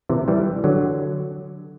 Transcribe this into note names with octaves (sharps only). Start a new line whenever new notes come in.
C3 E3
E3 G3
D3 F#3